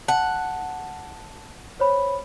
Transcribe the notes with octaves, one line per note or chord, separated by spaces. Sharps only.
F#5 A5
C5 C#5 B5